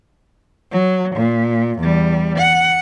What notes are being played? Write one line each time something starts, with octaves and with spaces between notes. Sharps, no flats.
F#3
A#2
E2 G3
F#5